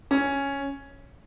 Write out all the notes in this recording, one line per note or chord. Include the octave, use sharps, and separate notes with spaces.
C#4